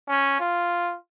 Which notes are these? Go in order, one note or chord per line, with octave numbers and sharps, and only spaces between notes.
C#4
F4